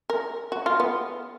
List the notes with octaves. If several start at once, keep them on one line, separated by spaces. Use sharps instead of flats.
A#4
F#4
F4
B3